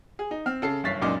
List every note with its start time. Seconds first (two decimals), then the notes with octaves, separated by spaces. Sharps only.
0.19 G#4
0.31 D#4
0.46 C4 F6
0.62 C#3 A4 C7
0.84 F#1 G2 C#5 A6 B6 C7
1.02 C#2 F#2 A#2 D4 D#4 D6